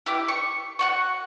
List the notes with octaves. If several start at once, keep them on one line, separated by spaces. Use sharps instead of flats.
E4 G4 D6
C#6
F#4 F#5 C#6